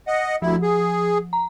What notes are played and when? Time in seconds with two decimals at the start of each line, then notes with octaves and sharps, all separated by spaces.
0.07 D#5 F#5
0.42 D2 F3 E4
0.62 G#4
1.33 A#5